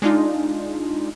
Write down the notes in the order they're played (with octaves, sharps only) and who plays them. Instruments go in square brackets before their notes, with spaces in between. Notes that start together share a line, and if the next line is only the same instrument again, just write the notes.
[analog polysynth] G#3 D4 D#4 F4